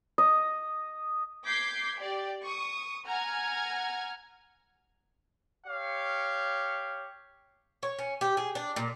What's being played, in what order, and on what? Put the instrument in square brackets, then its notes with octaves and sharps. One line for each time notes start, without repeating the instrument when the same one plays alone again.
[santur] D#5
[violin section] D6 G6 G#6 B6 C7
G4 D5
C#6 D#6
F#5 G#5 A#5 F6 G#6
[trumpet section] G4 C#5 F5
[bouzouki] C#5
C#4
G4
G#4
D4
A#2